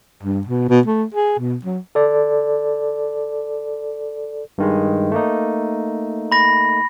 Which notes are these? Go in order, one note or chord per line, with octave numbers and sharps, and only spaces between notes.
G2
B2
B2
A3
G#4
B2
F#3
A4 D5
G2 D#3 G#3
A3 A#3 D#4
B5 A#6